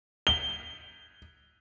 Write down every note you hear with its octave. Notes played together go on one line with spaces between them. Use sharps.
G7